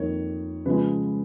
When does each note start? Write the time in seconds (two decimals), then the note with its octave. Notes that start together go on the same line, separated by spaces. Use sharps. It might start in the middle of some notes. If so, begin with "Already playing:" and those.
Already playing: F2 D#3 A#3 C#5
0.66 C#3 F3 G#3 B4